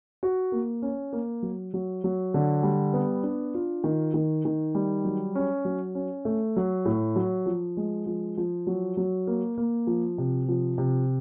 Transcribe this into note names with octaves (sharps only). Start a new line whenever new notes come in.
F#4
A#3
C#4
A#3
F#3
F#3
F#3
D3
G3
B3
D4
F4
D#3
D#3
D#3
G3
F#3
C#4
F#3
C#4
A3
F#3
A2
F#3
F3
G#3
F3
F3
F#3
F#3
A#3
A#3
F3
C3
F3
C3